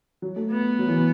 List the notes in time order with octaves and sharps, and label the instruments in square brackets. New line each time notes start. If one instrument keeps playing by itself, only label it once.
[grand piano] F#3
A3
[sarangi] B3
[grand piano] F#3
E3
B2